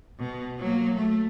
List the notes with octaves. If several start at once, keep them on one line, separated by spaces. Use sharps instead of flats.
B2
F#3 A#3
A3